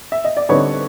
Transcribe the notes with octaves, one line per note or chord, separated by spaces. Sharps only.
E5
D#5
D5
D3 G3 C4 D#4 B4 C#5